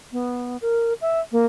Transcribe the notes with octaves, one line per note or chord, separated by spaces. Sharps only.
B3
A#4
E5
A#3